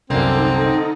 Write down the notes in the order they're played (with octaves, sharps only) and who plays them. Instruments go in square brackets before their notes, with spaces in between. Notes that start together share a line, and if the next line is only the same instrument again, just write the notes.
[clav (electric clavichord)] C2 F#2 [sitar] D3 A#3 [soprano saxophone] C4 [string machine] D#4 A4 D#5